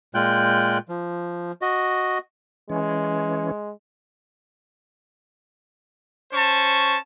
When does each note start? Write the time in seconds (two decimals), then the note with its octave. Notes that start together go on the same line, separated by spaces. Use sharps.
0.15 A#2 G#3 F4 G5 F#6 G6
0.89 F3
1.62 F#4 D#5
2.70 E3 G#3 C#4
6.33 C#4 C5 A5 C#6